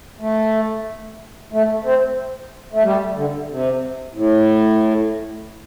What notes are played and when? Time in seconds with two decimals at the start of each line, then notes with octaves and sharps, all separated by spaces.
0.21 A3
1.53 A3
1.84 C4
2.73 A3
2.83 G3
3.16 D3
3.50 C3
4.14 A2